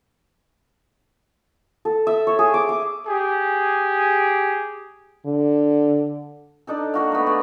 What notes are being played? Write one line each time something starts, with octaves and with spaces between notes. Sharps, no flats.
A4
E5
C#5
G#4
D6
D6
G4 G#4
D3
D4 D#4 A4
A#3 F#4 F5
A3 B3
G#4 D5